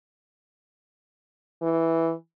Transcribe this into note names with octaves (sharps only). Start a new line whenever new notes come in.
E3